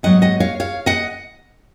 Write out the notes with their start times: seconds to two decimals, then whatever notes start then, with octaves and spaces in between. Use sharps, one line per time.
0.03 G#2 F#3 B3 D#5 F#5
0.22 D#5 F#5
0.40 C#5 F5
0.60 C#5 F5
0.86 D#5 F#5